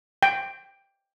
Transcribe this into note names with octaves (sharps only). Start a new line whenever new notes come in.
G5